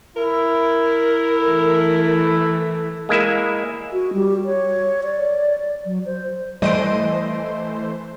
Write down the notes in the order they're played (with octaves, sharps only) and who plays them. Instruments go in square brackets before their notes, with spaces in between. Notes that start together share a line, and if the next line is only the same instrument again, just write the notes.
[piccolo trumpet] E4 [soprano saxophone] A#4
[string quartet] E3 A3
[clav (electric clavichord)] G#3 A#3 E4 E5
[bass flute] F#4
G3
C#5
D5
F#3
C5
[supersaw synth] E3 A3 C5 [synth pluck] G3 D7 [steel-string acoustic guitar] D#5